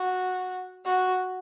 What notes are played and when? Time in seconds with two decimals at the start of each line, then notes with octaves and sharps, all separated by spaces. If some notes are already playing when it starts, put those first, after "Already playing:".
Already playing: F#4
0.85 F#4